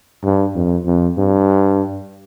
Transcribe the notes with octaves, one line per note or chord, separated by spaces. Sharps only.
G2
F2
F2
G2